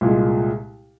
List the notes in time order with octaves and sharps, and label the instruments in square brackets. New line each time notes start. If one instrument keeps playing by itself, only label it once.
[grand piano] C2 A#2 G#3